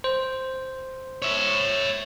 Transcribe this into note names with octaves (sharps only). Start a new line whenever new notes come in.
C5
C#5 E5